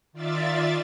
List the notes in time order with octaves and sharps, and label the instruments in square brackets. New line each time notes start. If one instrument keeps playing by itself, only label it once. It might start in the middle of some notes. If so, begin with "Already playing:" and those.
[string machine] D#3 F4 D5 E5 A6